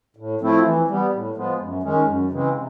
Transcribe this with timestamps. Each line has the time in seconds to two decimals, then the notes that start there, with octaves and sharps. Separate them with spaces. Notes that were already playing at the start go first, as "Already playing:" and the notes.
0.16 A2
0.41 F3 A3 C4 E4
0.64 E3
0.88 G3 B3
1.12 A2
1.35 F3 G#3 B3
1.59 F#2
1.83 D#3 G#3 C#4
2.06 F#2
2.30 C#3 E3 G#3 C4
2.54 C3